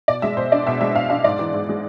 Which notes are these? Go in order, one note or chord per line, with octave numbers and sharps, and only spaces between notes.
B2 D5
G#3 E5
B2 C5
D4 D5
B2 E5
G#3 E5
B2 F5
D4 F5
G#2 D5
E3
G#2
G#3